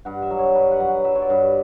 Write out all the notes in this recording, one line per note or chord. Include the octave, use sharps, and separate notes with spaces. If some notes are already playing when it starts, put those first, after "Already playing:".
G2 F#5
E5
F#3
C#5
G2 B4
F#5
F#3
F#5
F#3 E5
C#5
D5
G2